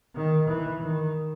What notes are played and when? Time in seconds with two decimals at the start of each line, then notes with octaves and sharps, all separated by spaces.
0.15 D#3
0.49 E3
0.83 D#3